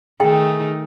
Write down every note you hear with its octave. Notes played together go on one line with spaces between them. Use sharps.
D#3 A3 D#4 G#4 G5